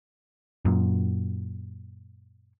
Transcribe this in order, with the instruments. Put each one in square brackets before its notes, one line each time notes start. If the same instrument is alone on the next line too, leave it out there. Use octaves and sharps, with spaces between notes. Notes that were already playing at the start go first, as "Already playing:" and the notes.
[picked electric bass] F#2 A#2